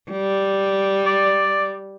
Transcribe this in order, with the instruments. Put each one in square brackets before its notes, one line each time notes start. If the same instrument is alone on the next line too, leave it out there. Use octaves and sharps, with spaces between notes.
[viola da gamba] G3
[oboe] D5